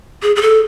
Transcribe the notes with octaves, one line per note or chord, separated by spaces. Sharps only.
G#4
G#4
A4